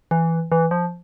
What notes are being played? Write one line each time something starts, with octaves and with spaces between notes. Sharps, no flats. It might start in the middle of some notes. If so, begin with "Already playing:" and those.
E3
E3
F3